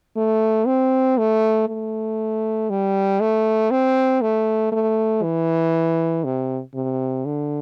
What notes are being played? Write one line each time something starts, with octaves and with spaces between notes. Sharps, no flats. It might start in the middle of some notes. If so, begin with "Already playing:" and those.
A3
C4
A3
A3
G3
A3
C4
A3
A3
E3
C3
C3
D3